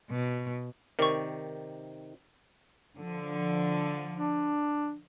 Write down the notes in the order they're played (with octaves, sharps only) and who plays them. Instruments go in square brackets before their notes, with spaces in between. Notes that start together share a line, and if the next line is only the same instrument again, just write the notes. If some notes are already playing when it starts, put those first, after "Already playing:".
[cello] B2
[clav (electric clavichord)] C3 D#3 D5 [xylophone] A#4 C#6
[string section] D3 F3
[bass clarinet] D4